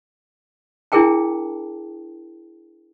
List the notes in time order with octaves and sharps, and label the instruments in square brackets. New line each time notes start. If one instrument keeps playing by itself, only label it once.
[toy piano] D4 E4 G#4 A#4 G5 A5